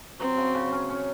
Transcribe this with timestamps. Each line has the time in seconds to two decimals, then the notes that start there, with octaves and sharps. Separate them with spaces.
0.20 F#3 C4
0.37 C#3
0.55 C#3
0.72 C#4
0.90 C#4